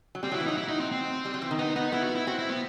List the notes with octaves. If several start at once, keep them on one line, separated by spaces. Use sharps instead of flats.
F#3
G3 C4
F#3
E4
E3
F#3 D#4
E4
D#4
C4
C4
G3
F#3
E3
D#3
B3 D#4
B3 D#4
B3 E4
F#4
E4
C4 F#4
E4
B3